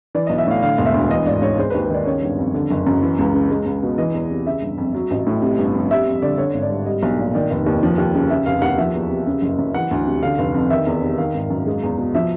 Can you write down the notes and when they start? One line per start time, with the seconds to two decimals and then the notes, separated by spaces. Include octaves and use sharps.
0.15 E3 D5
0.27 B1 D#5
0.38 E5
0.47 A2 F5
0.62 D3 F5
0.78 E1
0.86 E5
0.94 D2
1.10 E3 D#5
1.26 G#1 D5
1.42 G#2 C#5
1.58 G#3 C5
1.70 B4
1.74 D#2
1.82 B4
1.90 D#3 D5
2.06 C#3 C#5
2.22 G1
2.38 F2
2.54 D3
2.71 F#1
2.87 F#2
3.02 E3
3.19 C#2
3.34 C#3
3.51 G#3
3.66 C#2
3.83 B2
3.98 E3 D#5
4.14 E2
4.31 C3
4.46 C#3 E5
4.62 G1
4.78 F2
4.95 F#3
5.11 A1
5.27 A2
5.42 C3
5.59 G1
5.74 F2
5.91 G3 E5
6.06 F2
6.22 D3 D5
6.38 D3 C#5
6.54 G#1
6.62 D5
6.70 G2
6.86 G3 D#5
7.03 B1
7.19 A#2
7.34 D#3 D5
7.50 F1
7.66 D#2
7.83 F3
7.98 D#2
8.15 C#3
8.30 C#3 E5
8.46 F1 F5
8.62 D#2 F#5
8.78 F3 E5
8.94 E2
9.10 C3
9.26 C#3
9.42 F#1
9.59 F#2
9.74 E3 F#5
9.91 D2
10.06 C3
10.23 D3 F5
10.38 F1
10.54 F2
10.70 D#3 E5
10.87 E2
11.02 C3
11.18 D#3 F5
11.34 G#1
11.50 F#2
11.67 G#3
11.83 E2
11.98 B2
12.15 F3 E5